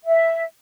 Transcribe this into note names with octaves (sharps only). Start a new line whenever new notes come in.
E5